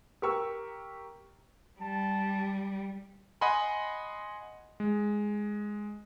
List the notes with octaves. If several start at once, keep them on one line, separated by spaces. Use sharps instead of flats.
G4 A#4 C#6 E6
G3 A5
D#5 F#5 G#5 B5 C6
G#3